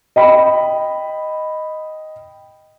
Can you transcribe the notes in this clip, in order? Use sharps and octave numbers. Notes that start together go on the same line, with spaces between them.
D#5 G5 B5